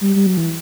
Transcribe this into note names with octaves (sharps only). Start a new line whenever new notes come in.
G3
G3
F#3
E3